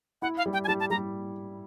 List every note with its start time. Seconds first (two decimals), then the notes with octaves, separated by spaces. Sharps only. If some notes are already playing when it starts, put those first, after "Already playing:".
0.22 E4 F#5
0.37 F5
0.46 G3
0.53 G5
0.64 G#5
0.68 G3 A5
0.80 A5
0.90 G3 A#5